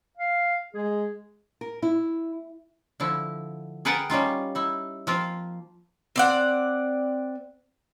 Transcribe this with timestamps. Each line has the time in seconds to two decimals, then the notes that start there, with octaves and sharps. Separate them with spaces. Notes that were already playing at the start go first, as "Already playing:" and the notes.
0.17 F5
0.75 G#3 G#4
1.61 A#4
1.82 E4
3.00 D3 F3 E4
3.85 G#4 A#4 B4 F#5 G5 A5
4.10 G3 C#4 D#4 F4
4.55 D#4 E4
5.07 F3 A#3 C4 F4
6.16 C4 D5 F#5